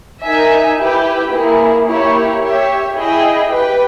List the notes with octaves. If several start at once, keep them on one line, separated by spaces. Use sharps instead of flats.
D#4 A#4 E5 G#5
E4 G4 B4 G5
A#3 E4 G#4
A#3 E4 G4 C#5
G4 C#5 E5
E4 G#4 D#5 G5
G4 B4 G5